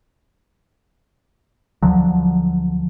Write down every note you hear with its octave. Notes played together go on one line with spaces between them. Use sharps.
D2 D3 F3 F#3